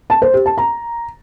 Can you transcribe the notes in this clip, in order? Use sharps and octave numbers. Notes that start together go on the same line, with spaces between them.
A5
C5
G4
A5
A#5